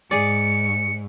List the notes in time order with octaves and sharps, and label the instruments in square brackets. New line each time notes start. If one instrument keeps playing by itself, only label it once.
[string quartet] G#2 [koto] G#4 D5 [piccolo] C#7